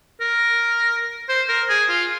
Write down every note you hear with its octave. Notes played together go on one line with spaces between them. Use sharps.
A#4
C5
A#4
G#4
F4